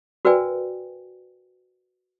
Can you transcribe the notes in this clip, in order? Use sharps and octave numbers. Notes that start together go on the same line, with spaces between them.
F#4 A#4 B4 D5 G5 G#5